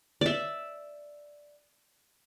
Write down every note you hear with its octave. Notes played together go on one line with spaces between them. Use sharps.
D5 E5